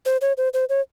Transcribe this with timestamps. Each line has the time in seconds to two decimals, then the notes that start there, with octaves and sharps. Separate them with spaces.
0.06 C5
0.21 C#5
0.37 C5
0.54 C5
0.69 C#5